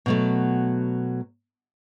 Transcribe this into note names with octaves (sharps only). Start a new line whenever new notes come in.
B2 F#3 A3